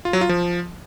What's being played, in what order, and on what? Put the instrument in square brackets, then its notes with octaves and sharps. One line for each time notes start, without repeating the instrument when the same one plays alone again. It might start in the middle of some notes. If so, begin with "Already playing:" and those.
[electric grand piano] F4
F#3
F4
F3